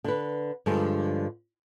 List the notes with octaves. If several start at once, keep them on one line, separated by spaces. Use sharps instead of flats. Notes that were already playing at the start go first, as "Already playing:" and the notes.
D3 B4
G2 D3 F3 G#3